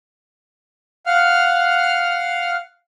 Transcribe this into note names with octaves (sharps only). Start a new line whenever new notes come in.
F5 F#5 F6